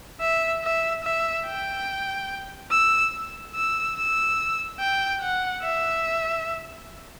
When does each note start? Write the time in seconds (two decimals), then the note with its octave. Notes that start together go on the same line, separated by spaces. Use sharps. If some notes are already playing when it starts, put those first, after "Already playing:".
0.21 E5
0.64 E5
1.04 E5
1.46 G5
2.72 E6
3.55 E6
3.97 E6
4.80 G5
5.21 F#5
5.63 E5